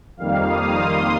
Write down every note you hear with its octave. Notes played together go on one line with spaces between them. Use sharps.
F2 D#3 G3 A#3 F5
D#6
C6